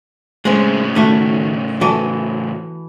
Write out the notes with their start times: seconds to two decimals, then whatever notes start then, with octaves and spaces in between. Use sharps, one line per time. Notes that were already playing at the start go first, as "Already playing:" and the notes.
0.45 A2 C#3 G#3 C4
0.95 D#3 A3 F#4
1.81 E3 F#4 A4